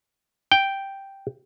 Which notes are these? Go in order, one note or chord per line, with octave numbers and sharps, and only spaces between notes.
G5